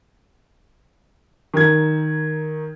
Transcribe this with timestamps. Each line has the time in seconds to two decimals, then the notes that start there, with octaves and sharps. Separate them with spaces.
1.54 D#3 A#4 G#6